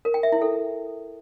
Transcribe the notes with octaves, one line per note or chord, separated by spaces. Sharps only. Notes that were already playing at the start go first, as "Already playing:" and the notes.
A#4
G5
E5
E4
A4